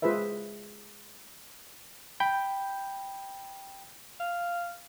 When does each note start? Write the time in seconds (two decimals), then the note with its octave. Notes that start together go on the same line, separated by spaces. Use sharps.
0.02 G#3 F4 G#4 B4 C5 E5
2.20 G5 B5 G6
4.20 F5